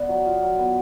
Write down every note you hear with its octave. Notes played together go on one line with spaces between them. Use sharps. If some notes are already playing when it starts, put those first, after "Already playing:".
Already playing: B3 D5 F#5
F#3
F4
F#3
B3